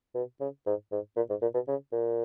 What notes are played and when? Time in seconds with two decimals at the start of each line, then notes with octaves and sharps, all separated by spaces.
0.15 B2
0.40 C#3
0.66 G#2
0.91 G#2
1.16 A#2
1.30 G#2
1.42 A#2
1.54 B2
1.68 C#3
1.92 A#2